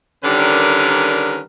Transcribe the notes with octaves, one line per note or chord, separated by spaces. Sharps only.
D3 D#3 G3 C#4 A#4 B4